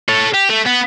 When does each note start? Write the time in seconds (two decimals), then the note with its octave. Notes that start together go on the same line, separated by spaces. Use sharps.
0.09 A4 C#5
0.34 G4
0.50 A3
0.66 B3